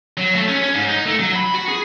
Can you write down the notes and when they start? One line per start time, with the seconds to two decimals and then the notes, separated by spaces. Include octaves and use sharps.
0.17 F#3
0.35 A3
0.48 C#4
0.63 C#4
0.75 G#2
0.89 D#4
1.06 A3
1.20 F#3
1.35 B5
1.54 F#4
1.68 G#4